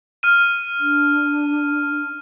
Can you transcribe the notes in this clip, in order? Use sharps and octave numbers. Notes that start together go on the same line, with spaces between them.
F6 D#7
D4